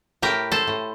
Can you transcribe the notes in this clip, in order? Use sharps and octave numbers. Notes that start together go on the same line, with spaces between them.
A2 G4 A#4
A4 C5
A2